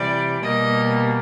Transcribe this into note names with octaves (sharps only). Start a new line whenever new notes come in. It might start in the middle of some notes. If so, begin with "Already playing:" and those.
Already playing: C3 E3 G3 D5
B2 G3 A#3 D#5